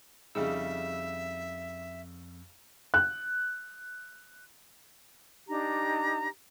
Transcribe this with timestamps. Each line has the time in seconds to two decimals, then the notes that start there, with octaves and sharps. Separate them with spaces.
0.35 F2 C#3 G3 D#4 G#4 E5 E6
2.94 F#6
5.47 D4 D#4 G4 A#5